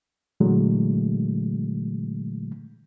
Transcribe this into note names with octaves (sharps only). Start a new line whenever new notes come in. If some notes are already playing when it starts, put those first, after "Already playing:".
A#2 D3 E3 F#3 G#3 A3